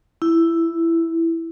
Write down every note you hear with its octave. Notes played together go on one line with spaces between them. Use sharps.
E4